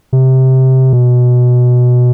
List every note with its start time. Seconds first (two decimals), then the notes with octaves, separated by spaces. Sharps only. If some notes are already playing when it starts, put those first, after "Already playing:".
0.13 C3
0.93 B2